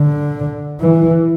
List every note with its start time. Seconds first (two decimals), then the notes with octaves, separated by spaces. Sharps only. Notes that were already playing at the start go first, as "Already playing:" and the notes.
Already playing: D3
0.80 E3